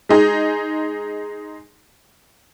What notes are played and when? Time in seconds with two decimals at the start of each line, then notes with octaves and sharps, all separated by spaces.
0.09 G#3 D#4 G#4